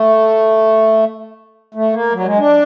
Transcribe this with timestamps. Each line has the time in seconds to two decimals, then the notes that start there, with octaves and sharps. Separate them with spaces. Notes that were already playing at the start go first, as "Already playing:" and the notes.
Already playing: A3
1.74 A3
1.93 A#3
2.13 F#3
2.20 G3
2.25 G#3
2.38 D4